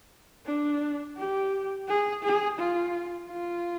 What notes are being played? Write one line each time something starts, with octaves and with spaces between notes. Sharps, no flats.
D4
G4
G#4
G#4
F4
F4